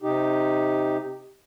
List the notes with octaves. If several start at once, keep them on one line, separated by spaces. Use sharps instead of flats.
C3 D#4 G4